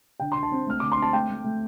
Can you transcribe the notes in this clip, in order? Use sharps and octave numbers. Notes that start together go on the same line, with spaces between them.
D3 G5
D3 C6
A5
C4
A3 F6
D3 D6
C6
C4
A5
A3 G5
A3
A3